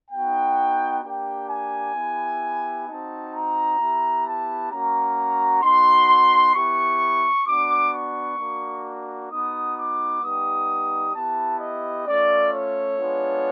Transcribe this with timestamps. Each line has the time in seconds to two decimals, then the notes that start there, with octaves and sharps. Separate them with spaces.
0.11 B3 D#4 F#4 G5
1.03 A#3 D4 G4 G5
1.49 G#5
1.95 B3 E4 G4
2.86 C4 D#4 F#4 A5
3.32 A#5
3.79 B3 E4 G4
4.25 A5
4.71 A#3 C#4 F#4 A#5
5.62 B3 D#4 F#4 C6
6.54 B3 E4 G4 C#6
7.46 B3 D4 F#4 D6
7.92 C#6
8.38 A#3 D4 F#4
9.30 B3 D#4 F#4 D#6
9.77 D6
10.22 G3 B3 D#4 G4 D#6
11.14 B3 E4 G4 A5
11.60 D#5
12.06 A3 C#4 F4 D5
12.52 C#5
12.98 G#3 B3 D4 F4